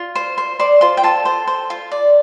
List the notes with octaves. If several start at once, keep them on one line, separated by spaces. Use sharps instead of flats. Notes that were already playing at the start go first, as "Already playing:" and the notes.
Already playing: F4
C5
C5
C5 D5 D6
F4 C5 C6
G5
F4 A4 A5
C5
C5
F4
D5